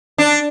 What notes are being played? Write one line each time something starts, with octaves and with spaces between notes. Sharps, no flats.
D4